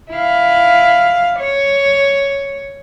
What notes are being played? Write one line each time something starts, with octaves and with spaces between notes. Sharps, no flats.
E4 F5
C#5